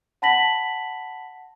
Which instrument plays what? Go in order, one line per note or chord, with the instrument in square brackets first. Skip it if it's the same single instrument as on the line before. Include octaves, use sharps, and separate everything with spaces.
[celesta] F#5 A5 B5 A#6 B6 F#7